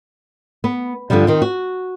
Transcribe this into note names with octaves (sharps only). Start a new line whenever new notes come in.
B3
G2 D3 D#3 F3 G3
D#3 C4
F#4